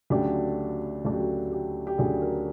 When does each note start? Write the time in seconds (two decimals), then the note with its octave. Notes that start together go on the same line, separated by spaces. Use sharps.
0.10 D2 C#3 F#3 A3 D4 G4
1.05 D2 C#3 F#3 A3 D4 F#4
1.12 G4
1.20 F#4
1.52 G4
1.87 G4
1.98 D2 C#3 F#3 A3 D4 G#4
2.22 A#4